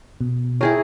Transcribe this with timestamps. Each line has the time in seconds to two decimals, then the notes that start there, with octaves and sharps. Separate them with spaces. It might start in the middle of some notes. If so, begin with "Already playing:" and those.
0.21 B2
0.61 E4 G#4 A#4 C#5 G5 G#5